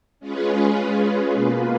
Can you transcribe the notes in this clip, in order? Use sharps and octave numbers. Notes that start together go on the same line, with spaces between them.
G#3 C#4 F4 G#4 B4
B2 A#3 F4 B4